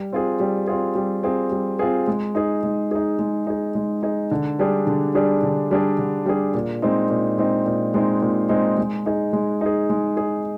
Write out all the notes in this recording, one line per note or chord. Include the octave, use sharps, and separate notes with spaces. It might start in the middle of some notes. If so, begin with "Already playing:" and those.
Already playing: G3
C4 F4 G#4
G3
C4 F4 G#4
G3
C4 F4 G#4
G3
C4 F4 G#4
G#3
D#4 G#4
G#3
D#4 G#4
G#3
D#4 G#4
G#3
D#4 G#4
D3
G3 D4 G#4
D3
G3 D4 G#4
D3
G3 D4 G#4
D3
G3 D4 G#4
A#2
G#3 C4 D#4
A#2
G#3 C4 D#4
A#2
G#3 C4 D#4
A#2
G#3 C4 D#4
G#3
D#4 G#4
G#3
D#4 G#4
G#3
D#4 G#4